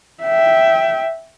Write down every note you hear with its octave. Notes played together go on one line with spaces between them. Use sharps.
E5 G5